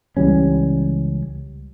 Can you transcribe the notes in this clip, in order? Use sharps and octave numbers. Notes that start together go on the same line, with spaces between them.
C#2 E3 G3 C#4